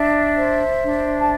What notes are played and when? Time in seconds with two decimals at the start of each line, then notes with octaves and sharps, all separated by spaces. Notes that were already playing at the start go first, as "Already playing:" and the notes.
Already playing: D4 E5
0.36 C5
0.82 D4
1.19 A5